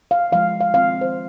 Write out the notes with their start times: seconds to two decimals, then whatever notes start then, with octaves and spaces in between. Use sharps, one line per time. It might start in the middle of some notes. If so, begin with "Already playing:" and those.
0.11 F5
0.32 F3 G#3 F4 F5
0.60 F5
0.73 D#3 C4 F4 F5
1.01 C5